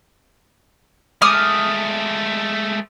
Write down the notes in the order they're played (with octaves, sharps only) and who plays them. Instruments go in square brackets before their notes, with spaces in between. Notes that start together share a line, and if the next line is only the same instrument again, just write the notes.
[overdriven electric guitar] G#3 A3 [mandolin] D#6 F6